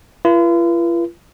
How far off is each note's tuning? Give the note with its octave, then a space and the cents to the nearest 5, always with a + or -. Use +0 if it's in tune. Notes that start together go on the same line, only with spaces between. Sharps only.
F4 -45 B4 -40